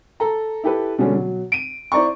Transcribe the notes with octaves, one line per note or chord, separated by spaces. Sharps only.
A4 A#5
E4 G4 A4 B4
B2 D3 G3 G#3 C#4
B2 F#3
D7 D#7
E4 C5 D5 A#5 C#6